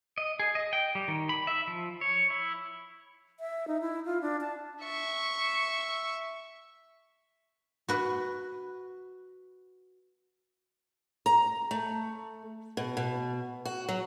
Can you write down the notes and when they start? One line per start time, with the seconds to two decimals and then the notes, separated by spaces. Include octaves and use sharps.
0.18 D#5
0.40 G#4
0.55 D#5
0.73 G5
0.95 G3
1.08 D#3
1.29 B5
1.47 E5
1.68 F3
2.01 C#5
2.30 E4
3.40 E5
3.68 D#4
3.81 E4
4.05 F4
4.22 D4
4.41 A5
4.83 E5 C#6
7.88 F#4 B4
11.26 A#5
11.71 A3
12.77 B2
12.97 B2
13.65 F#4
13.88 F#3